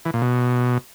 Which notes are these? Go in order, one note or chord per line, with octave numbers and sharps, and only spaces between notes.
E3
A#2
B2